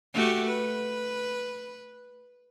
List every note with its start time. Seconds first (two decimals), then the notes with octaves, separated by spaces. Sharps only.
0.14 A3 F#4 G4
0.46 B4